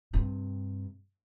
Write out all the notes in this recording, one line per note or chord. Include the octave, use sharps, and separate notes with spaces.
G2 C3